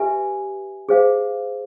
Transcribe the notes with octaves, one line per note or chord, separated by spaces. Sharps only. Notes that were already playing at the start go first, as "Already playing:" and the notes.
Already playing: G4 B4 E5 G#5
G#4 C5 F5